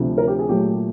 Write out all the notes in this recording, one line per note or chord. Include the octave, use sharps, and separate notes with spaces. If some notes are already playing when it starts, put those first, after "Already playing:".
Already playing: D2 C3 F3 A3
A#4
G4
G#4
A#2 F#3 A3 G4